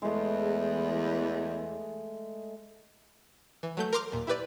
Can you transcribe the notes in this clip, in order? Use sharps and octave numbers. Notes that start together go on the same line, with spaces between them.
E2 G#3 A3
E3
F#3 A3 G6
A#4 A#5 C6 D6 F6
D#2 A#2
E4 G4 B4 D5